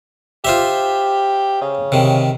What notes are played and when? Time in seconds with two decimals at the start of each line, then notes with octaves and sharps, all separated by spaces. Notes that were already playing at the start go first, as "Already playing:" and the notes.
0.45 F4 G4 C5 E5
1.61 C#3
1.92 C3 D#3